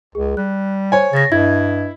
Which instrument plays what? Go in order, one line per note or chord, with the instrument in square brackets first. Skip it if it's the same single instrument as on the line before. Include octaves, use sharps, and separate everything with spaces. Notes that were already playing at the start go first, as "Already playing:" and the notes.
[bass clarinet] C#2 [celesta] G#4
[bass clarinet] G3 [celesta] F#6
[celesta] C5 [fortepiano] C#5 G#5
[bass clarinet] C#3 [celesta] A6 A#6
[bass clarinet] G2 [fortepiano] E4 [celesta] D#5 G#6